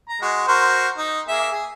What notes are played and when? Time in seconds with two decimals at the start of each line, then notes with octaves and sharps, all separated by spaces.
0.09 A#5
0.22 G#3 F#4
0.48 F#4 A#4 C5
0.97 D#4
1.28 A#3 G#4 E5
1.52 G#4